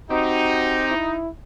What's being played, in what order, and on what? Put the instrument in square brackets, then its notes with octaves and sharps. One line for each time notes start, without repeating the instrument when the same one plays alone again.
[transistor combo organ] C4 G4 [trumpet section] D#4 [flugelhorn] F#4
[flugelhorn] E4